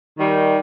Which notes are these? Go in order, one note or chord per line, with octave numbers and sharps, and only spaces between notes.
D#3 G3